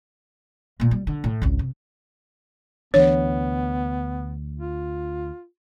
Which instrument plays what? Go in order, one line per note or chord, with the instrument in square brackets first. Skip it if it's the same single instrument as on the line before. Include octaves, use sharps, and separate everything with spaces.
[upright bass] A#2 A#3
G3
D3
A2
G#1 C#2
C3
[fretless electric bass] D2 E3 D4 [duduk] B3 [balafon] C#5
[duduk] F4